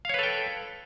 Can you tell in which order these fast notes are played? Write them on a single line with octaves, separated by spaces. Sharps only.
F5 C#5 B4 A4 G5